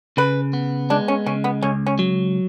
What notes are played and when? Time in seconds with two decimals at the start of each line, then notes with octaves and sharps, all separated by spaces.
0.17 C#3 B4
0.53 B3
0.90 G#3 D4
1.08 C#4
1.26 C#3 C#4
1.44 B3
1.63 C#2 C#4
1.87 C#4
1.99 F#3